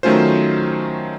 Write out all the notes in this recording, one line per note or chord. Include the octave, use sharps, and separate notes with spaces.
D#3 F#3 A3 C#4 F4 C5